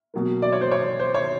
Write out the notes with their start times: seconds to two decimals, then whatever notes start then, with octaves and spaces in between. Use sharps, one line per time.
0.14 B2 F#3 A#3
0.42 D5
0.52 C#5
0.61 C5
0.71 C#5
1.00 C5
1.14 C#5